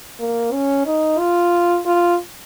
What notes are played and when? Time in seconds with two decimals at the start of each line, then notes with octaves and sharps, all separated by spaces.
0.19 A#3
0.52 C#4
0.86 D#4
1.19 F4
1.86 F4